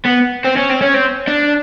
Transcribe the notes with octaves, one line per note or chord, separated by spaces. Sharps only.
B3
C4
C#4
C4
C#4
C4
D4